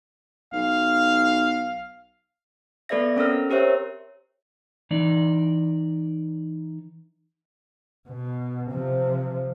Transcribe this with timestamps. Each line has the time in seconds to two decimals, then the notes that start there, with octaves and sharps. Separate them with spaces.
0.53 B1 F5
2.89 B3 A4 B4 D5 E5 A#6
3.16 C4 C#4 A4 A#4 E6 F6
3.50 G4 A#4 C5 C#5 E5
4.91 E3 D#4 D5
8.08 B2
8.71 C3 F3